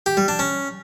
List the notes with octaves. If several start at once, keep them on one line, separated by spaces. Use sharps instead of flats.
G4
G3
D4
C#4